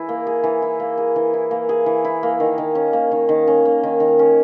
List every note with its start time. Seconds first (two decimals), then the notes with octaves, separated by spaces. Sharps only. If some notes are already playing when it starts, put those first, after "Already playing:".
Already playing: E3 E4 G#4
0.09 A#3
0.27 G#4
0.44 E3
0.62 E4
0.80 A#3
0.98 G#4
1.16 E3
1.34 E4
1.51 A#3
1.69 G#4
1.86 E3
2.05 E4
2.23 A#3
2.40 D#3
2.58 D#3
2.75 C#4
2.93 A#3
3.12 D#3
3.29 D#3
3.47 C#4
3.65 A#3
3.83 D#3
4.00 D#3
4.19 C#4